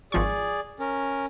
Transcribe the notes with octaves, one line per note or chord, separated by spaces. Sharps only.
G#1 F3 G#4 D5 C#6
C#4 A#4